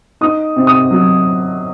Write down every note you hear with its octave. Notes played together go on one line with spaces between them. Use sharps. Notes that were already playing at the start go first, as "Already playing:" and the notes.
D#4 D#6
C3
D#6
F#3